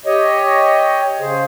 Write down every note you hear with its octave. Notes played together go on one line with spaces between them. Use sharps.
G4 C#5 D#5
C#3 G#4 C5